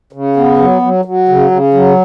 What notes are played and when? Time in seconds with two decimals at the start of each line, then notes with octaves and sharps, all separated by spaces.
0.13 C#3
0.36 B3
0.59 F#3
0.82 F#3
1.05 F#3
1.29 C#3
1.51 C#3
1.74 F#3